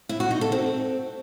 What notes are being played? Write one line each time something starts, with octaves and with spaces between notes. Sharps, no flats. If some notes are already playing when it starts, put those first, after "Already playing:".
E4
F#4
D#4
A4
C4